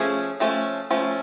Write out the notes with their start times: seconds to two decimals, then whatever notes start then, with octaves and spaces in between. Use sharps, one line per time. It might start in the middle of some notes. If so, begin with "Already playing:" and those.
Already playing: F3 A3 C#4 G#4
0.40 F3 A3 C#4
0.90 F3 A3 C#4